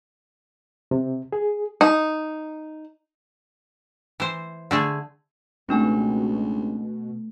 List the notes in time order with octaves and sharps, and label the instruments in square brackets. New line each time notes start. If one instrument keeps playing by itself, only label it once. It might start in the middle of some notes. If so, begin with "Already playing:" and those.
[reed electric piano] C3
G#4
[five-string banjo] D#4
[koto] E3 C5
D3 A3 G#4
[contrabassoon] C#2 [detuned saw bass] B2 [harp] A3 B3 [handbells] C4 D4 G#5